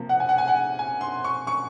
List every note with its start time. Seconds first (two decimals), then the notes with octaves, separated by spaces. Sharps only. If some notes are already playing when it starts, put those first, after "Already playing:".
Already playing: C3 F3 A#3
0.09 F#5
0.20 G#5
0.29 F#5
0.38 G#5
0.48 F#5
0.79 G#5
1.01 C6
1.24 C#6
1.47 C#6